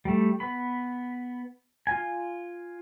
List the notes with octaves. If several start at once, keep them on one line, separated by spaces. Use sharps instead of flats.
G3 A3
B3 B5
F4 G#5